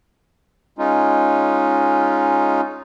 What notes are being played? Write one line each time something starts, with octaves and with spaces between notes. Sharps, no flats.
G#3 C#4 D#4 F4